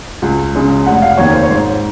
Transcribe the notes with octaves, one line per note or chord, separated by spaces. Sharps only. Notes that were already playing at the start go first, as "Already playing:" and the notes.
C#2
C#3 G#3 C#4
F1 F#5
F5
D#2 D#3 A#3 C#5
C5
C#5
G#2 C5